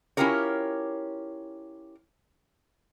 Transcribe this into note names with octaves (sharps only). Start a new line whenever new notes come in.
C#4 E4 F4 G4 A#4 C#5